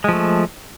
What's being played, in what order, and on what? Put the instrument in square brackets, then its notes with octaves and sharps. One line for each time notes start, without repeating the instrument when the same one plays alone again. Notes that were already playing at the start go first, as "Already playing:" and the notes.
[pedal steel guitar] G#3
F3
A3